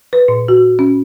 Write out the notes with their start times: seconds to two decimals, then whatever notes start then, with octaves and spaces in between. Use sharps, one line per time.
0.13 B4
0.28 A#2
0.48 F#4
0.79 C#4